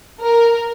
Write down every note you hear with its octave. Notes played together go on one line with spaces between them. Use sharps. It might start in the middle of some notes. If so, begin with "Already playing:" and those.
A#4